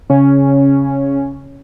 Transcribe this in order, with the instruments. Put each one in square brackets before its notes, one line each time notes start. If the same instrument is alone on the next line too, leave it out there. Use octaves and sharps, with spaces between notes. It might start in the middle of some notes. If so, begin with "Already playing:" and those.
[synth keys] C#3 C#4